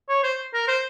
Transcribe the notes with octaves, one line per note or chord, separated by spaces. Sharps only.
C#5
C5
A#4
C5